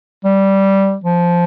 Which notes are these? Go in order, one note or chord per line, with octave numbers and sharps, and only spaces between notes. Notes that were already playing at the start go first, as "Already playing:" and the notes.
G3
F3